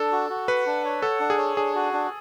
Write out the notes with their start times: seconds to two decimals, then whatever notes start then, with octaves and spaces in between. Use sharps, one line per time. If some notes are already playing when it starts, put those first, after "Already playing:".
Already playing: D4 A4
0.12 F#4
0.30 F#4
0.48 B4 F#5
0.66 D4
0.85 C#5
1.02 A4 F#5
1.20 D4
1.30 G#4
1.38 C#5
1.57 D4 G#4
1.75 F#4
1.93 D4